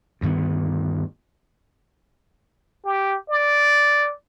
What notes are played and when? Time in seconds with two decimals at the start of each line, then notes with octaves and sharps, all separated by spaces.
0.21 D2 G2 D#3 B3
2.85 G4
3.30 D5